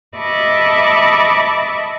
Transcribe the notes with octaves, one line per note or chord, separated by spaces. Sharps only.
D#5 E5 A5 B5 C#6 D6